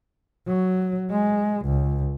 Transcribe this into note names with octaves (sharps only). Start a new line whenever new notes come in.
F#3
G#3
C#2